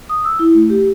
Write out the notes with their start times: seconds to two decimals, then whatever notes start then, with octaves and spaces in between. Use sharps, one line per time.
0.09 D#6
0.25 E6
0.39 E4
0.55 A3
0.70 G4